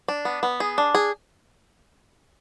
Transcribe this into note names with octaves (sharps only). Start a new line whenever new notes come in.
D4
B3
B3
G#4
D4
G#4